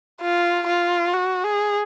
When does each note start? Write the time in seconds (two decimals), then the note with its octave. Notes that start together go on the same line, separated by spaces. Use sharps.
0.22 F4
0.67 F4
1.13 F#4
1.44 G#4